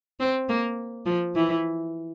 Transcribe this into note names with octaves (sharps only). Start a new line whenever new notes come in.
C4
A#3
F3
E3